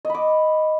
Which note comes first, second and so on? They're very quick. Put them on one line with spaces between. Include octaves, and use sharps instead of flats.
D#5 B5 D6